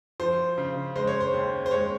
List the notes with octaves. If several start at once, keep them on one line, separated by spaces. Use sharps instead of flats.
F3 C5
C#3
G#3 C5
C#5
C5
D#2
C5
G#3 C#5